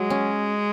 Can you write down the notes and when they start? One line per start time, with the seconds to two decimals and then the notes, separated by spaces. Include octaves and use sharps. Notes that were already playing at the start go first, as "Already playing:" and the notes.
Already playing: F#3 G#3
0.10 C#4